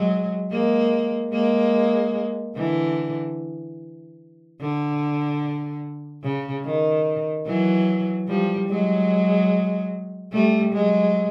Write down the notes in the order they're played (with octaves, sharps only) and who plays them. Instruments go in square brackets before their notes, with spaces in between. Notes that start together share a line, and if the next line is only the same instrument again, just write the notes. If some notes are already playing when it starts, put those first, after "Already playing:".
Already playing: [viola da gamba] F#3 G#3
G#3 A#3
G#3 A#3
D3 E3
D3
C#3
D#3
E3 F#3
F3 G3
F#3 G#3
G3 A3
F#3 G#3